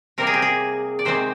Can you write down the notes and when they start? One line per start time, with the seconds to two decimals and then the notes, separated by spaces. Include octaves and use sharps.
0.18 C3 G3 A#3 A#4
0.27 G#4
0.34 G4
0.42 G#4
0.99 D5
1.05 C3 D#3 G#3 C4 C5